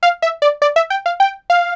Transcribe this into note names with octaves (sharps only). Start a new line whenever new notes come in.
F5
E5
D5
D5
E5
G5
F5
G5
F5